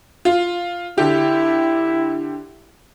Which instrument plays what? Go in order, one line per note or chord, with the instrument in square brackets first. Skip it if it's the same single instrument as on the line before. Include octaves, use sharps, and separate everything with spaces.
[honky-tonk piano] F4
[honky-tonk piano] D3 G4 [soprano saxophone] E4